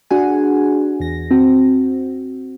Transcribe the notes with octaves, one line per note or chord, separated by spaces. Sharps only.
D4 F#4 G#4 F#5 G#5
E2 A#6
C4 F#4